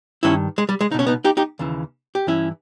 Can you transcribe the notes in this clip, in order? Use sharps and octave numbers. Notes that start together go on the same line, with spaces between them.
G2 D#3 C#4 E4
G#3
G3
G#3
C#2 B2 D#4
C#4
B3 D#4
D#4 G4
D#4 G4
D#2 C#3 E3
G4
G2 E3 C#4 E4